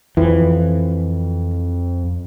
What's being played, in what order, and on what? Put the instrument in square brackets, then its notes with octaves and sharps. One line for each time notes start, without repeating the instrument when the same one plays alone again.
[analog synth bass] F2 [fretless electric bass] E3